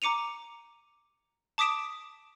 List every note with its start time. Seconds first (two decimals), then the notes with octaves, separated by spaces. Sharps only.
0.02 A#5 D6 C#7 D#7 F7
1.58 A5 D6 D#6 B6 D7 E7